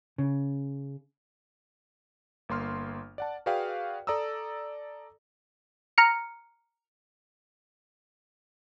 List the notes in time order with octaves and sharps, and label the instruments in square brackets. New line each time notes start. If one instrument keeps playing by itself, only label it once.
[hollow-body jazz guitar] C#3
[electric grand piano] G1 A#3 C6 F6
D5 F#5 A5
F#4 G#4 B4 D5 F5 G5
A4 D5 A#5 D#6 E6
[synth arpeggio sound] A#5 F6 C#7